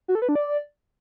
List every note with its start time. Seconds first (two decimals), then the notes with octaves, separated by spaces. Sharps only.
0.08 F#4
0.15 A4
0.22 B4
0.29 D4
0.35 D5